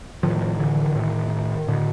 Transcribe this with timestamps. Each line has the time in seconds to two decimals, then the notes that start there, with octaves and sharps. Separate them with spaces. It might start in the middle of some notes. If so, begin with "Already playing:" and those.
0.23 A2 D#3 F3
0.59 D3 E3
0.95 A2 D#3
1.68 A2 D3